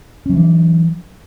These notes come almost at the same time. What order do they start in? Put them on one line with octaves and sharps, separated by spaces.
C#4 F#3 E3 D4